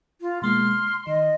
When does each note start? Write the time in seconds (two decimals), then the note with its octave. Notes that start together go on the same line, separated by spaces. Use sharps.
0.21 F4
0.42 B2 G#3 A#3 C6 F6
0.88 C7
1.07 D#3 D#5